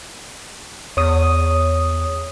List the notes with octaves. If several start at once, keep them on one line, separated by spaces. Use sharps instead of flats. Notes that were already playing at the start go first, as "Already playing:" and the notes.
E2 C#5 D#6